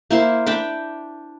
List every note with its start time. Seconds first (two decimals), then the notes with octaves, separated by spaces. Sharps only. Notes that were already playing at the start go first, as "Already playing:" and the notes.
0.11 A#3 E4 C5
0.46 D4 G5 B5